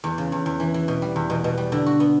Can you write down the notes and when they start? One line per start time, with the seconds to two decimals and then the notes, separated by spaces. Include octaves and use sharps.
0.04 E2
0.18 C#3
0.32 E2
0.46 E2
0.60 E3
0.74 E3
0.88 B2
1.02 G3
1.16 E2
1.30 B2
1.44 B2
1.58 G3
1.72 D3
1.86 F#4
2.00 B3